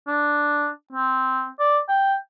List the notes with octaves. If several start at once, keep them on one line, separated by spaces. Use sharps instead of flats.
D4
C4
D5
G5